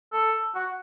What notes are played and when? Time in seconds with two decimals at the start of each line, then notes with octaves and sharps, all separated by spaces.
0.13 A4
0.55 F#4